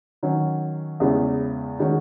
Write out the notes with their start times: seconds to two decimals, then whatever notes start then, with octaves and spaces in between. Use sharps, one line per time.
0.23 D#3 F#3 C#4
1.00 E2 C#3 G#3 C#4 E4
1.79 D#3 G#3 C#4 F#4